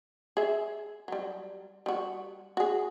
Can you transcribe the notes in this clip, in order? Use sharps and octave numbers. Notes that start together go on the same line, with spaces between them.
G#4 E5
F#3 G3
G3 F#4
F#4 G#4